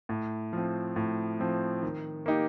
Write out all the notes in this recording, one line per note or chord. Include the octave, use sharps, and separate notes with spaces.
A2
F3 C4
A2
F3 C4
D#3
A#3 D#4 G4